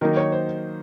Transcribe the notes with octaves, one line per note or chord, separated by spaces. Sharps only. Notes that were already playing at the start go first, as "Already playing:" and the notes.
D#3 F#3 A#3 D#4 A#4
C#5
C5